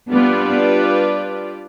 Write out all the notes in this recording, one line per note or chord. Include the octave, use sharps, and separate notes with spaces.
G3 B3 D4 F4 B4 D5